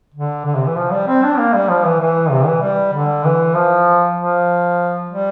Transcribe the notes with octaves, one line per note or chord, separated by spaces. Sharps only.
D3
D3
C3
E3
F3
G3
C4
D4
A#3
G3
F3
E3
E3
C3
E3
G3
D3
E3
F3
F3
G3